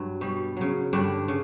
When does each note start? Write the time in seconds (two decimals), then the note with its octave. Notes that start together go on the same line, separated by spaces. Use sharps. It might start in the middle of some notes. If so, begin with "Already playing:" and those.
Already playing: G2 F#3
0.21 B2 G3
0.57 C#3 F#3
0.93 G2 D3 G3 D4
1.28 C#3